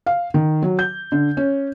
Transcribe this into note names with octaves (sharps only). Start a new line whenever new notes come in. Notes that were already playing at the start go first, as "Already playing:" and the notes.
F5
D#3
F#3
G6
D3
C#4